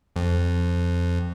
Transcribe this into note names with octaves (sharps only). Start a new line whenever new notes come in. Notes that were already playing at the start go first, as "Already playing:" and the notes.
F2